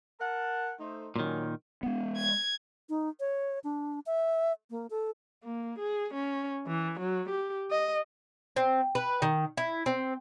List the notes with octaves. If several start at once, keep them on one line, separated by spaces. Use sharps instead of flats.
A#4 F#5 A5
A3 D#4 C5
A#2 D#3 F#3 C#4
G#3 B3
G#6
D#4
C#5
D4
E5
A#3
A4
A#3
G#4
C#4
E3
F#3
G4
D#5
C4
B4
D#3
E4
C4